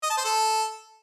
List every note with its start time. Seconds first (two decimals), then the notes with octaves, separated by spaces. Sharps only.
0.03 D#5
0.10 A5
0.17 C5
0.25 A4